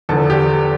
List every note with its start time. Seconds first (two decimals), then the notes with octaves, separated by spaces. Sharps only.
0.09 E2 D3 F3 A4
0.30 G4